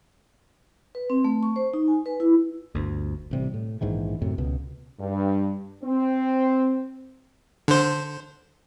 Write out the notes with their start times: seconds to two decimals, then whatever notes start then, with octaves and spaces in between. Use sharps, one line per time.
0.95 B4
1.10 C4
1.24 A3
1.43 C#6
1.56 C5
1.74 D#4
1.88 G#5
2.06 B4
2.20 E4
2.75 G1 D2
3.31 A1 C3 G3
3.54 A2
3.81 A#1 G#2 D#3 E3
4.22 F#2 A2 C3
4.38 C#2 B2
5.00 G2
5.84 C4
7.68 D3 C5